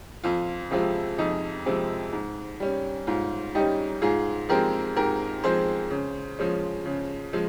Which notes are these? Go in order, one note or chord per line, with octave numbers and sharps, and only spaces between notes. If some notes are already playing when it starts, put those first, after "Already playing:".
F2 F4
C3 F3 G#3 C4 F4
F2 D#4
C3 F3 G#3 C4
G#2
G3 C#4
G#2 F4
G3 C#4 D#4 G4
G#2 F4 G#4
F3 G#3 C4 G4 A#4
G#2 G4 A#4
F3 G#3 C4 G#4 C5
C#3
F3 G#3 C#4
C#3
F3 G#3